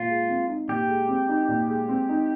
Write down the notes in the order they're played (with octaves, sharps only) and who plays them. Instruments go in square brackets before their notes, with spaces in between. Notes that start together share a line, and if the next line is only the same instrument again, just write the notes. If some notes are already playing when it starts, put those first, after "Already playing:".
Already playing: [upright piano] A#2 [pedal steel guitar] F4
[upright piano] G#3
C4
D#4
[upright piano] A#2 [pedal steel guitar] G4
[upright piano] G#3
C4
D#4
A#2
G#3
C4
D#4